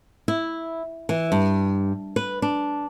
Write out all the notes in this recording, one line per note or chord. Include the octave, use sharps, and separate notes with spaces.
E4
E3
G2
B4
D4